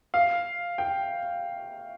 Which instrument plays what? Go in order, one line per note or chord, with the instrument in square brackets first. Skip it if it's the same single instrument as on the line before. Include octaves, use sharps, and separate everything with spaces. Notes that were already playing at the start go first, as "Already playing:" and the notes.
[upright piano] F5
G5